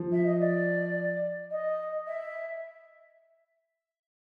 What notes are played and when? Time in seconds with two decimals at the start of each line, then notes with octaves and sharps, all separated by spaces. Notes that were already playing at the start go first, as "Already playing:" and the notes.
Already playing: F3
0.12 E5
0.26 D#5
0.40 D5
1.51 D#5
2.07 E5